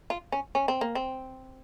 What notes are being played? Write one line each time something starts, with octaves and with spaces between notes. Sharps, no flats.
F4
C#4
C#4
C4
A#3
C4